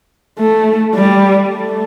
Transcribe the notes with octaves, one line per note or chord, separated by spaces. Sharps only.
A3
G3
A3